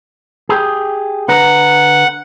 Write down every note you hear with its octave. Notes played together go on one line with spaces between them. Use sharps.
G4 G#4
D3 B4 F#5 A#5